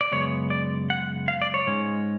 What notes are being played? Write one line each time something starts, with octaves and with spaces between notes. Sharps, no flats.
D5
F#2 C#3 G#3 B3 C#5
D5
F#5
F5
D5
C#5
G#2 G#3 C#4